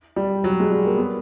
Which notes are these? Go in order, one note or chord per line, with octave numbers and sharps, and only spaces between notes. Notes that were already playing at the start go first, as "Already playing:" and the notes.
G3
F#3
G#3
G3
A#3
B3